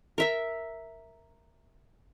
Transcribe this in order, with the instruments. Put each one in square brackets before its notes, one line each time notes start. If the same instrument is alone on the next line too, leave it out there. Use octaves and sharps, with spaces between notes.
[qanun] A#4 E5 A#5